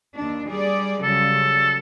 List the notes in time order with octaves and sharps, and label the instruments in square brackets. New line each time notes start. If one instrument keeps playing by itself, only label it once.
[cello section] D#2 D4
G3 G#4 D5
[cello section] C#3 F#3 G3 [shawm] A4